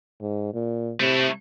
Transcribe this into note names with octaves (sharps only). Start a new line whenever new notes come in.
G#2
A#2
C3 A3 E4